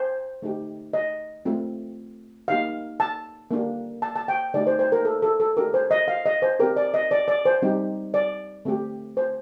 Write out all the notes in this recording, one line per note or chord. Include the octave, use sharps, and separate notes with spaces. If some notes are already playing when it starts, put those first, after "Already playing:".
Already playing: C5
A3 D#4 G4
D#5
A3 C4 F4
A#3 D#4 G4 F5
A5
A#3 D4 G4
A5
A5
G5
A3 D#4 G4 D5
C5
C5
A#4
A4
A4
A4
A3 D4 G4 A#4
C5
D#5
F5
D#5
C5
C4 G4 A#4
D5
D#5
D5
D5
C5
G3 C4 D#4 G4
D5
A3 C4 G4
C5